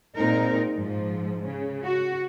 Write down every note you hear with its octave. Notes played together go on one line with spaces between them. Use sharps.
A#2 G#3 C4 D#4 A#4
G#2 F3
C#3
F#4